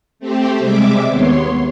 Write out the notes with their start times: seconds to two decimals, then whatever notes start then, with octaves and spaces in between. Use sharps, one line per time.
0.19 A3 C4 G4
0.59 C3 G3 G#3 E5 D6
1.07 D#2 B3 C#5 C6